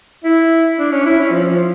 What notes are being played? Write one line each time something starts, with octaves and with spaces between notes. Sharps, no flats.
E4
D4
C#4
E4
C#4
F3
F3